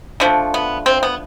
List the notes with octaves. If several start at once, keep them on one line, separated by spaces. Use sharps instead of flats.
D3 F3 A3
B3
C4
B3